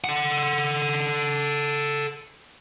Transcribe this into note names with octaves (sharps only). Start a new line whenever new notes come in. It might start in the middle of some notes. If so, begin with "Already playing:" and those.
A4 F#5